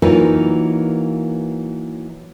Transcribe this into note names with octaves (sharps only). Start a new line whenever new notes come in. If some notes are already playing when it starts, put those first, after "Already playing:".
E3 F#3 A#3 D#4 F4 B4